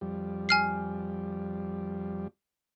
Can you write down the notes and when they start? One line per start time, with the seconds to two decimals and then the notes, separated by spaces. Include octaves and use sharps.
0.01 F2 G3
0.49 G#5 F6 C7